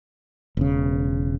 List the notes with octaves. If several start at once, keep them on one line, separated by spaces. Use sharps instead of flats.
E1 C#3